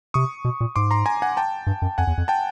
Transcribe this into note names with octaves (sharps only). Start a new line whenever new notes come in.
C3 C#6 D#6
B2
A#2
G#2 C6 D6
A#5 C6
G#5 A#5
F#5 G#5
G5 A5
G2
F#2
F2 F#5 G#5
E2
F2
G5 A5